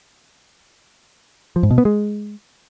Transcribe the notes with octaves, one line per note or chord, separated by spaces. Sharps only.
F3
G#2
B2
B3
G#3